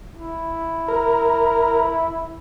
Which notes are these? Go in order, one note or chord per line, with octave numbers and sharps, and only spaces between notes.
E4
A#4